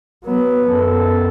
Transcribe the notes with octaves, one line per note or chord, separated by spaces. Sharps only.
F#3 B3
F#2 B3 A4